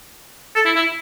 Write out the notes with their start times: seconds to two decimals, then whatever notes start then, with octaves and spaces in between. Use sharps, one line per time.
0.55 A4
0.65 E4
0.76 E4